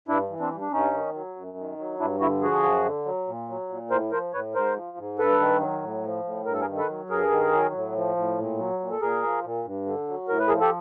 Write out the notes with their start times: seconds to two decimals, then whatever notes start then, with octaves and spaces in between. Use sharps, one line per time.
0.08 G2 D4 E4
0.30 E3
0.40 C4 D4
0.51 G2
0.61 D4
0.72 G2 C#4 D#4
0.93 D#3
1.14 F#3
1.36 F#2
1.57 D#3
1.78 F#3
2.00 G2 D4 E4
2.20 D3 E4 F#4
2.42 F3 F#4 G#4
2.63 F#2
2.85 D3
3.05 F#3
3.27 A#2
3.49 F#3
3.69 A#2
3.90 A2 A#4 C5
4.12 F3 A#4 C5
4.33 A2 B4 C#5
4.54 G#2 A#4 C5
4.76 F3
4.97 G#2
5.19 G2 A4 B4
5.40 D#3
5.60 F#3
5.82 A2
6.03 F3
6.24 A2
6.46 G2 A#4
6.54 A4
6.61 G#4 A#4
6.68 D#3
6.78 A4 B4
6.89 F#3
7.10 G2 G#4 A#4
7.31 D#3
7.52 F#3
7.74 A2
7.95 F3
8.16 A2
8.38 A#2
8.58 F#3
8.80 A#2
8.91 A4
9.01 A#2 G#4 A#4
9.23 F3
9.44 A#2
9.65 G2
9.86 D3
10.08 F#3
10.28 A2 A#4
10.39 B4
10.48 F3 G#4 A#4
10.61 G4 A4